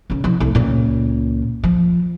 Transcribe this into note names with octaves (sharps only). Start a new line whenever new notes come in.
C#2 C#3
C2 F3
C2 A3
C#2 A#2
F3